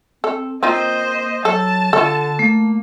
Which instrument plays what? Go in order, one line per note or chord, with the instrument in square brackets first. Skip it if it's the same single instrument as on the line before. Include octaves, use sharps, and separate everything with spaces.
[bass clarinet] C4 [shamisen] A4
[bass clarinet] A#3 [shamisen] C4 D#4 F4 [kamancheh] C5 D#5
[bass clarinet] F#3 [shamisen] A4 [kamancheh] A5
[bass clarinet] D3 [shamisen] F4 A4
[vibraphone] A3 [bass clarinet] A#3